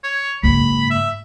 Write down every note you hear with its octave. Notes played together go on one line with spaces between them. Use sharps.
C#5
F#1 G#2 B5
E5